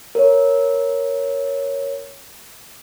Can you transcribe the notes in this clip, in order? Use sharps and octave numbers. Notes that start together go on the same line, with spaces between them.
A#4 C#5